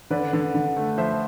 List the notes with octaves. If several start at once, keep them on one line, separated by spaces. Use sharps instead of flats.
D3 B4 D5
D3
D3
A3
F3 C5 E5